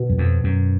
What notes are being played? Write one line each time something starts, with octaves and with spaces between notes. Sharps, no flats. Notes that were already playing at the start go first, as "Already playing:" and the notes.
Already playing: B2
F#2
F2
F#2